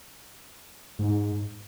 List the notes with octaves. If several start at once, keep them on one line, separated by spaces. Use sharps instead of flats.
G#2